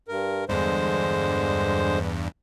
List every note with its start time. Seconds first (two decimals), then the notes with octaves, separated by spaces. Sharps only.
0.08 G2 A#4
0.49 E2 G2 D3 G#3 C5